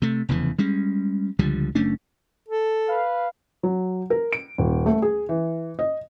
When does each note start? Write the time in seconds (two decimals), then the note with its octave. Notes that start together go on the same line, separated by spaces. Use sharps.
0.02 C3 A3
0.29 F1 E2 C#3 E3
0.59 G3 G#3 C#4
1.39 C#2 D3 F3 G3
1.75 F#1 A3 C#4 D4
2.48 A4
2.88 B4 F5
3.63 F#3
4.10 A#4
4.33 D7
4.58 D#1
4.86 A3
5.02 G#4
5.29 E3
5.79 D#5